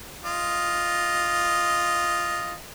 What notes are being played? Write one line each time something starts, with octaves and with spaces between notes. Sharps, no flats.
F4 D#5